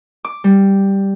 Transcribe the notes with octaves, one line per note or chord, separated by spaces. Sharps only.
D6
G3